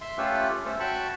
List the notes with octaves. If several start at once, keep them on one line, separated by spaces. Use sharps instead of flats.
E5 C6
A3 C#4 F4 G4 A4 B4
A3 C#4 A4 C5
F#4 G5 A5 B5 C#6